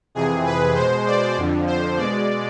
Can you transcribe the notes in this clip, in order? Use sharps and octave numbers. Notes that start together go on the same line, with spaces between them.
F2 C3 E3 G#4
B4
B2 G#3 C5
D5
F2 D3 F3
C5
B2 G#3 D5